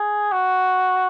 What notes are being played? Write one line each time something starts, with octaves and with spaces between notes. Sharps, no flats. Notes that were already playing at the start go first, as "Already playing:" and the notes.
Already playing: G#4
F#4